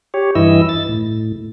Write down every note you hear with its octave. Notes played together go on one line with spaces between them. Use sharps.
G4 C#5
G2 E3 E4 D#5 E6
A6
A2